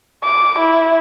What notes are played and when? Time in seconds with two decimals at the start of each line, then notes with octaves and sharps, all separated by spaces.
0.24 D6
0.59 E4